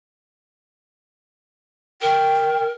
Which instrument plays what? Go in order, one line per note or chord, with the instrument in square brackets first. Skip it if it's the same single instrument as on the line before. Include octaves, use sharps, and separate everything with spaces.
[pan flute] A#4 [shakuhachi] G5